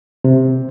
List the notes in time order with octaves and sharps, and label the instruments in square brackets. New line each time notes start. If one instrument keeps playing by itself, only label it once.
[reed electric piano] C3